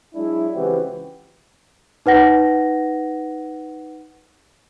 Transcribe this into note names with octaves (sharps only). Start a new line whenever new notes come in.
F#3 G#3 D4 E4
C#2 E3 G#3 C4 F#4 G4
D#4 B4 F#5 A#6